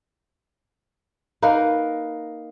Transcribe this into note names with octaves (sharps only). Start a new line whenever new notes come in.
A#3 D#4 A#4 B4